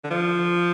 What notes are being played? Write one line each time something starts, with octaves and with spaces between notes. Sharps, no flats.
D3
F3